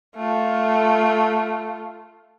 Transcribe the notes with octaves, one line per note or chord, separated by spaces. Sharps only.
A3 F4